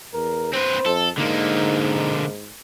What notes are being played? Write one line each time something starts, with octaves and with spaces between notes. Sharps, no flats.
E2 A#4
C4 B4 C5
F2 A4
G#2 D3 A#3 D#4